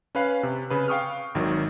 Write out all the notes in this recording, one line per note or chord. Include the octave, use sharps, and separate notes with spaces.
C#4 B4 F5 F#6
C3
C#3 B4
F5 G5 C#6 D#6 F6
G#1 D#3 F#3